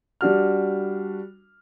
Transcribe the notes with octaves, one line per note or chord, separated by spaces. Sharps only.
G3 D4 F#4 F6